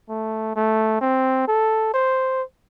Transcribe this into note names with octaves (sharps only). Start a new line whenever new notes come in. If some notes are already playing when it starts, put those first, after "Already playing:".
A3
A3
C4
A4
C5